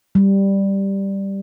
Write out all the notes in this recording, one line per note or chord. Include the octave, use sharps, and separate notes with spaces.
G3